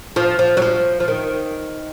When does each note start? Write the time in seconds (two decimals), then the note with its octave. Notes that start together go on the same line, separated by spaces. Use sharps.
0.16 F3
0.39 F3
0.57 F#3
0.62 F3
1.00 F3
1.08 D#3